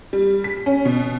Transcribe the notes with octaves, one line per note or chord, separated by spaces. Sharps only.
G3
B6
C#4
B2